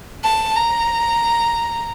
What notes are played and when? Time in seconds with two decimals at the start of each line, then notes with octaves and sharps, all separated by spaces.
0.24 A5
0.56 A#5